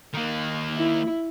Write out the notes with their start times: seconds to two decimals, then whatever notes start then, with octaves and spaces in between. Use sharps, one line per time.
0.14 D#3 A#3
0.76 E4